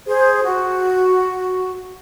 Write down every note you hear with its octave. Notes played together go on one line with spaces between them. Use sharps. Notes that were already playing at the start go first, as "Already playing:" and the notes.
G#4 C5
F#4